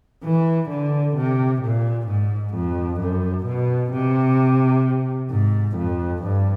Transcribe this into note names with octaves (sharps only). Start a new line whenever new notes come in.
E3
D3
C3
A#2
G#2
F2
F#2
B2
C3
G#2
F2
G2